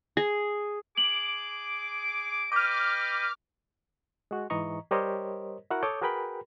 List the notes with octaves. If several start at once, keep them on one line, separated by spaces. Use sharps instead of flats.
G#4
G#4 D6 F#7
B4 D#5 G5 D6 F6
G#3 F#4
G#2 E3 D#5 A#5 C#6
G3 G4 A#4 C5 C#5 D#5
E4 F#4 A#4 F#5
A4 C#5 D6 D#6 G6
F#4 G#4 A#4 B4 G5 B5